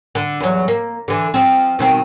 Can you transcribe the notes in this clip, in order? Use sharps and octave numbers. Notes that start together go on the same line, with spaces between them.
D3
E2 F#3
A#3
D3 E3
F3 C4
B2 D#3 C4